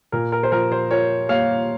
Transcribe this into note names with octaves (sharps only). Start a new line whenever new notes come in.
A#2 A#4
A#4
C5
F3 A#4
C5
F4 A#4 C#5
A#3 C#5 F5